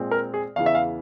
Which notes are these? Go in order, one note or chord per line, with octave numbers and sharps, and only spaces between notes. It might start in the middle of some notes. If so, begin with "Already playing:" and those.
Already playing: A#2 G#3 C4
A#4
G#4
E2 C#3 E3 F5
E5
F5